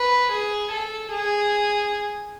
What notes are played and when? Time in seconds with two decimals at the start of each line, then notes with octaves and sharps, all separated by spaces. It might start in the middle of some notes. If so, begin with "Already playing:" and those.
Already playing: B4
0.32 G#4
0.71 A4
1.12 G#4